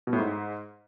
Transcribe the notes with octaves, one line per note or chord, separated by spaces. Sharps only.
B2
A2
G#2